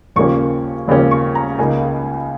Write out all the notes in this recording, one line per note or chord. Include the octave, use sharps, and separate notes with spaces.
D#2 C#3 F3 A#3 C#4 C#6
D#2 C#3 F3 A#3 C#4
C#6
A#5
C#2 C#3 A#3 D#4 G#5